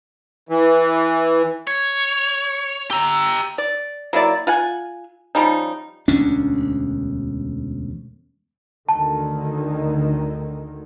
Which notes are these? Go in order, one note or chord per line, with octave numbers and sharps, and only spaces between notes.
E3
C#5 G#6
G4 A#5 E6
D5
F#3 A#3 E4 D5
F4 F#5 G#5
F3 G3 C#4 D#4
E1 D2 C#4 D4
D2 D3 D#3 A5